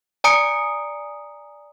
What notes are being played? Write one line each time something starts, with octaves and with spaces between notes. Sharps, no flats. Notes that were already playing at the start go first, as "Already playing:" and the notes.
D5 G#5 A#5 D#6 C#7 D7